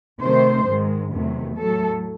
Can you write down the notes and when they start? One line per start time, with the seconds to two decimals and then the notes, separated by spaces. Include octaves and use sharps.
0.22 C3 D#3 A3 C4 C5
0.66 G#2 D#3 G#3
1.12 E2 C3 D#3 F#3 A3
1.57 A2 F#3 A3 A4